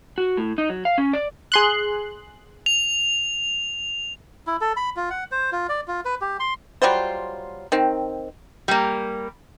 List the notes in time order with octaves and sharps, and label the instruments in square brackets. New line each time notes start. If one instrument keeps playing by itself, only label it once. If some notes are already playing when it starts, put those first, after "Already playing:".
[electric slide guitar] F#4
A2
D#4
F#3
F5
C#4
D5
[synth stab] G#4 C6 F#6
[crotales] F7
[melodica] E4
A4
B5
F4
F#5
C5
F4
D5
F4
B4
G4
C6
[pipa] F#3 G3 F4 C5
D#3 C4
[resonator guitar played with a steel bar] G3 A#3